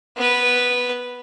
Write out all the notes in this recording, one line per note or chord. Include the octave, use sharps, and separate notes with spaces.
B3 B4